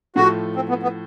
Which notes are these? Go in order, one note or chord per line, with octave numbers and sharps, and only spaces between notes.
A2 F3 A3 F#4
C4
B3
B3